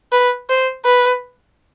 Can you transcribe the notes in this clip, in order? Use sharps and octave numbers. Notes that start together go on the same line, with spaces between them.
B4
C5
B4